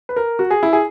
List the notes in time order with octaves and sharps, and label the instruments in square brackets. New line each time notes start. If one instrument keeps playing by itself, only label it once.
[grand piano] B4
A#4
F#4
G#4
E4
G#4